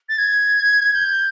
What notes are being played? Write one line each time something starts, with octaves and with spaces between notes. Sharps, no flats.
A6
G#6
G6